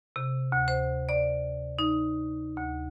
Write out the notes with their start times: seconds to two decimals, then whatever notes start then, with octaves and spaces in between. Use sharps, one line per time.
0.16 C3
0.52 D2
0.68 C5
1.09 D5
1.79 D#4
2.57 D2